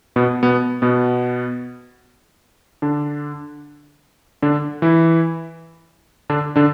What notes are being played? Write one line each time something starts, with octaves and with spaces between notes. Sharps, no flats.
B2 B3
B2 B3
B2 B3
D3 D4
D3 D4
E3 E4
D3 D4
D3 D4